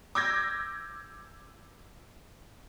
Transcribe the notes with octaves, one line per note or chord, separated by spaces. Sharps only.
D6 E6 G6 G#6 A#6